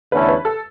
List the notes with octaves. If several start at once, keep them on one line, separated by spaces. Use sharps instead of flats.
E2 D3 A3 C#4 E4 B4
B4
A4